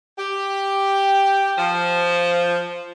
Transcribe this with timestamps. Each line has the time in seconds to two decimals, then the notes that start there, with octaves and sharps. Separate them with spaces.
0.18 G4
1.58 F3